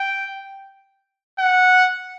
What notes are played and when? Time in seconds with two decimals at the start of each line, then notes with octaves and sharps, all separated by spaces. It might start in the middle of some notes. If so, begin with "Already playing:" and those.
Already playing: G5
1.39 F#5